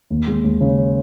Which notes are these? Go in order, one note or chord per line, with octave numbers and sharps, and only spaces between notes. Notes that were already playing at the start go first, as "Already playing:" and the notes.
D#2
G#3
D#2
C#3